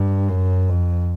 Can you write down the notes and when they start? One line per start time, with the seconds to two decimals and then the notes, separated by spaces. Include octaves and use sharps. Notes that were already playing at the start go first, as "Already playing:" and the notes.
Already playing: G2
0.29 F#2
0.69 F2